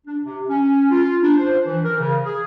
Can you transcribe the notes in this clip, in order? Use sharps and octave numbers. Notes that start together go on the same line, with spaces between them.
D4
C3
C#4
F4
D4
C5
E3
A#4
C#3
G#4